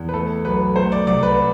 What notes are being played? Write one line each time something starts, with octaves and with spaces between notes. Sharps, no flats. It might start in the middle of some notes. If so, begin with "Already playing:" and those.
Already playing: E2
B4
A3 A4
B1 B4
A3 C5
D5
C2 D5
B4